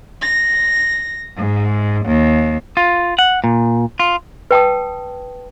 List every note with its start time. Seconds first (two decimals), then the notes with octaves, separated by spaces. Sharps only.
0.21 A#6
1.37 G#2
2.05 D#2
2.77 F4
3.19 F#5
3.44 A#2
4.00 F4
4.51 B4 G5 A5 D#6